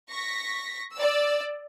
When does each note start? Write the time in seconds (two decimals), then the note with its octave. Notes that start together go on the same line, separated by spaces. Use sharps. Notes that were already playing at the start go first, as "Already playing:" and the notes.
0.10 C#6 A#6 B6
0.95 D5 E6